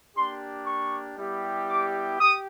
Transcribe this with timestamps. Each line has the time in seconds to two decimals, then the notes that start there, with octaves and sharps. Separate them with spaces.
0.16 A#3 D4 G4 C6
0.66 C#6
1.17 G3 B3 E4 G4
1.68 D6
2.18 G4 D#6